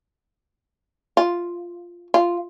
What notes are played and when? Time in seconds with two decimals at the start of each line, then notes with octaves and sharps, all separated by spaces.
1.17 F4
2.14 F4